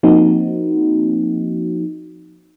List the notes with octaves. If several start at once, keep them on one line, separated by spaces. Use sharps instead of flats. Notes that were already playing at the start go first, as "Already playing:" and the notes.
F3 A#3 C4 D#4 F#4